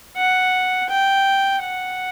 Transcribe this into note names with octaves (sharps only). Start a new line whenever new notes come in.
F#5
G5
F#5